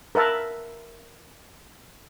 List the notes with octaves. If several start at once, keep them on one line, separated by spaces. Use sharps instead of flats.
A#4 B4 E5 A5